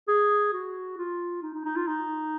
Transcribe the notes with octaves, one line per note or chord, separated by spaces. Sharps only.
G#4
F#4
F4
D#4
D#4
D#4
F4
D#4